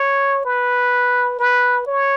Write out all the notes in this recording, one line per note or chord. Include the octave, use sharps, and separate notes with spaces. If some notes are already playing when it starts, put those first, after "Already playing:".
Already playing: C#5
B4
B4
C#5